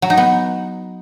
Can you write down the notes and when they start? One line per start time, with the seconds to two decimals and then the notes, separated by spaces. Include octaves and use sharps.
0.02 F#3
0.10 D#4
0.17 B3